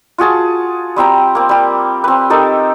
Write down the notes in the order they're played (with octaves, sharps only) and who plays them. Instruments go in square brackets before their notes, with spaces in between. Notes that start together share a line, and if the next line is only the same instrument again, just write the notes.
[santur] F4 F#4 G#4 A5
G3 C4 G5 A#5
A#3 C4
G3 G4
C4 B4
D#4 G4 A4 A#4